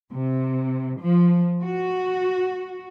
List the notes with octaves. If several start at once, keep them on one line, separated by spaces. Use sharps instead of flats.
C3
F3
F#4